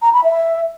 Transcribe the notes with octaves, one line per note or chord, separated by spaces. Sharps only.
A#5
B5
E5